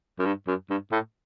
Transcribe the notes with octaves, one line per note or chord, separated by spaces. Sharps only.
F#2
G2
F#2
G2
A2